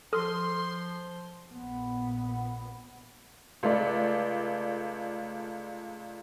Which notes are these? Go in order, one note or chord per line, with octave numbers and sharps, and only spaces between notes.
F3 A4 C6 D#6 F6
A#1 A#2 B3
C#2 A3 D5